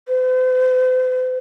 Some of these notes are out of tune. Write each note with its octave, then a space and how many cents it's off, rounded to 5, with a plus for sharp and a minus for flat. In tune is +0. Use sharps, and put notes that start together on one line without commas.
C5 -45